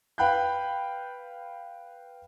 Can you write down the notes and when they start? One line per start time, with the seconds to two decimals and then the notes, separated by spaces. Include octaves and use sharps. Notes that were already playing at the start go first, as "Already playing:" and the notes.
0.18 B4 F5 G5 B5 F#6 G6